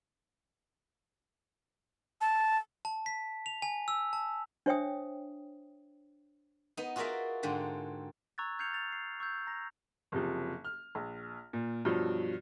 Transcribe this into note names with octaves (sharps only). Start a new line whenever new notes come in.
A5
A5
B6
F7
G#5
E6
A5
D4 C5 C#5 E5 G5 D#6
B3 D#4
F4 F#4 G#4 A#4 D5 E5
G#2 D3 C4
A#5 C#6 E6 F#6 G#6 A6
F6 G6 G#6 C7 C#7 F7
A6 F7
C7
C#6 E6 G6 G#6
A#5 A#6
F#1 C3 F3
F6
A#1
A#2
G2 B2 F3 F#3